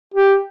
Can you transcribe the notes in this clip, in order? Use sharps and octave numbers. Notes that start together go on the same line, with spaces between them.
G4